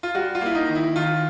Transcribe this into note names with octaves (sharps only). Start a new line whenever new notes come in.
F4
G3 F#4
F4
A#3 E4
D#4
D#3
E4
D#3 F4